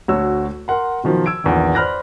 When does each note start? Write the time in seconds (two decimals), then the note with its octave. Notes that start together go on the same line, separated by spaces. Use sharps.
0.08 D2 F#4 C#5 E6
0.68 A#4 F#5 C6
1.04 B2 D#3 F3 F#3
1.26 E6 G#6 D7
1.44 A#1 E2 D#3
1.75 C5 D5 B5 F6 F#6 A#6